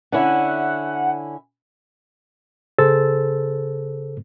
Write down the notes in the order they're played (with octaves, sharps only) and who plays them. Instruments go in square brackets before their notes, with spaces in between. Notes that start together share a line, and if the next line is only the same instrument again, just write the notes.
[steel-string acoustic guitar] D3 C#4 E4 [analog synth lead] F#5
[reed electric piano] C#3 G#4 A4 C5 E6 A6